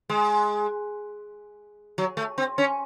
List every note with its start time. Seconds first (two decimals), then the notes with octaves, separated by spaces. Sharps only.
0.09 G#3
1.98 F#3
2.17 A3
2.38 C4
2.58 C#4